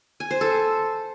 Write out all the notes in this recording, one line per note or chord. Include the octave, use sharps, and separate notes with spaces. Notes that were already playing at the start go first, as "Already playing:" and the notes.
G#5
C5
A4